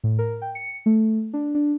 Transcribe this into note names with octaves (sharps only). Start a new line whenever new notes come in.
A2
A#4
G5
C#7
A3
D4
D4